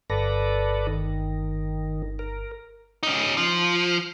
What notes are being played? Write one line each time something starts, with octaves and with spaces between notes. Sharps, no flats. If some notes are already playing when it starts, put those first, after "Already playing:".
G1 A4 B4 D5 A#6
D#3
A#4
C#4 D#4
F3